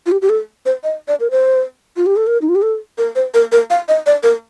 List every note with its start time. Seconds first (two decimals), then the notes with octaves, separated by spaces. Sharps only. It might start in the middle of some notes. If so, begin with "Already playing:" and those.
0.06 F4
0.12 G4
0.22 G4
0.29 A4
0.66 C5
0.84 D#5
1.08 D5
1.20 A#4
1.31 C5
1.96 F4
2.06 G4
2.16 A4
2.27 A#4
2.42 D#4
2.49 F4
2.55 G4
2.62 A4
2.98 A#4
3.16 C5
3.34 A#4
3.52 A#4
3.70 F5
3.88 D#5
4.06 D5
4.23 A#4